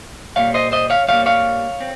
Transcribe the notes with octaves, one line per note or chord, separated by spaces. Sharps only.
A#2 G3 A#3 C#5 F5
C5 D#5
C5 D#5
C#5 F5
G2 G3 A#3 C#5 F5
C#5 F5
C4